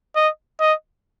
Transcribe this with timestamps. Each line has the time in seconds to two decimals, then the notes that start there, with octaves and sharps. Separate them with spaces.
0.15 D#5
0.60 D#5